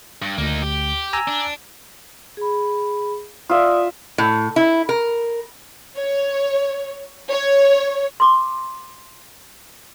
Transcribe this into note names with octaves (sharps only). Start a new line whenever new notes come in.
G2
D2 A#3 D#4
G4
G#5 A#5 E6
D4
G#4 B5
F4 D5 E5 D#6
A2
E4
A#4
C#5
C#5
C6 D6